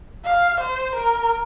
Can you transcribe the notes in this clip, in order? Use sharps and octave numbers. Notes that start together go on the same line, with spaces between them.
F5
C5
A#4